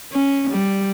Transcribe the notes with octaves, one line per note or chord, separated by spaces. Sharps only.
C#4
G3